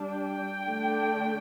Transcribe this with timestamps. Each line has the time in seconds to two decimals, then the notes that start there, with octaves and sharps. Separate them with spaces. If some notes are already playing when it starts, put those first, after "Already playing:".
Already playing: G3 D4
0.13 G5
0.67 D3 A3 D4